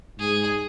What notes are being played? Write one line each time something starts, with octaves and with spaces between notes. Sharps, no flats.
G#2 G#4